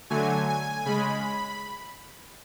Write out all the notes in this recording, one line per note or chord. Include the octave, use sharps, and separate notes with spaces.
D3 F#3 A3 G#5
G#5
C#3 G#3 B5